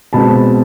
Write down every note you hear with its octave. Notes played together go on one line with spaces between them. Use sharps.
B2 G#3 C4 A5 B5